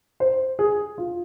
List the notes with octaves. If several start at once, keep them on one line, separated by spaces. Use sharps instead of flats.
C5
G#4
F4